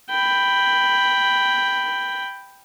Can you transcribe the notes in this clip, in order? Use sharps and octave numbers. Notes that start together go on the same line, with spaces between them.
G5 B5